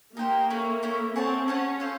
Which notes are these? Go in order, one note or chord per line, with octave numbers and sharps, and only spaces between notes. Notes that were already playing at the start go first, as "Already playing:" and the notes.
A#3 D#4 G4 C5
A3 C#4 E4
A3 C#4 E4
C4 G#4 C#5 F#5 A5
C#4 G#4 C#5 F#5 A5
F4 A4 C5